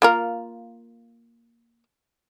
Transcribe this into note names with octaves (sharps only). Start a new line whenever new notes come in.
A#3 F4 A#4